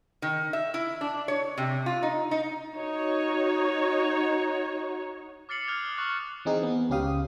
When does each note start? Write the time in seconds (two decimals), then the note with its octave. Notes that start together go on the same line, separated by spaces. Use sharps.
0.22 D#3
0.53 E5
0.74 E4
1.01 D4
1.28 C#5
1.58 C3
1.86 F4
2.03 D#4
2.31 D#4
2.73 D#4 F#4 C#5
5.49 D6 F6 A6 C7 C#7 F#7
5.67 D6 D#6 F6 F#6 G#6 F7
5.98 C#6 D#6 F#6 G#6 A6 F#7
6.45 E3 C4 D#4 G#4
6.63 B3
6.90 C#2 C#4 G4 F5 D#6